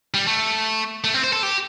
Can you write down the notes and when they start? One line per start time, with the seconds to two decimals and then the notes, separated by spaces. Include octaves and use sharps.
0.14 G3
0.27 A3
1.04 A3
1.14 C4
1.24 C5
1.33 A4
1.43 G4